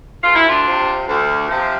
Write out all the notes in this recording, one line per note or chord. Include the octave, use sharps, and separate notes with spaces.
D2 F4
E4
D4 F4
C3 F3
D2
C3 F3